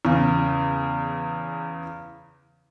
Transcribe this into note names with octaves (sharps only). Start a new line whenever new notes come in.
E2 C#3